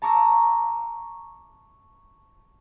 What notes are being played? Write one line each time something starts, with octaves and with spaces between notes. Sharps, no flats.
A5 A#5 C#6 D6 E6 A#6